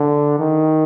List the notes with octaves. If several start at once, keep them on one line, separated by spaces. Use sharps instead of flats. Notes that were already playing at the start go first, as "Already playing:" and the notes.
Already playing: D3
D#3